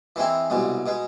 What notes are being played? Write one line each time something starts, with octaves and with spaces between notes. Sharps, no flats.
E3 G#3 C4 E4
C2 B2 G#3
B2 G#3